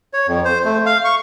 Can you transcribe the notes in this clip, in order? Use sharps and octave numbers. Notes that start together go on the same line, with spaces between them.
C#5
F2
C5
A3
F5
C#6